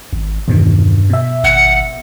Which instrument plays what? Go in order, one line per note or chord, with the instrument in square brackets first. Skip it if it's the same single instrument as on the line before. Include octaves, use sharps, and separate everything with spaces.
[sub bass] G#1
[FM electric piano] E2 B2 D#3 [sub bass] G2
[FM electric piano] B2 E5
[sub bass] G#1 [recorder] F#5